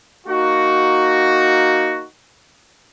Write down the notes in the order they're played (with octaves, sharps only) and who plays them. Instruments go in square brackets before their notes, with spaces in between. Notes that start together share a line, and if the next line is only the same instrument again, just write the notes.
[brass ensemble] A#3 D#4 F#4